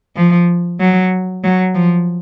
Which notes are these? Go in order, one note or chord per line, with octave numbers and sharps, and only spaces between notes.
F3
F#3
F#3
F3